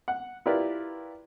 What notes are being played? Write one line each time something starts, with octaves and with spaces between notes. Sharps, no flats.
F#5
E4 F4 G4 A#4 B4 D5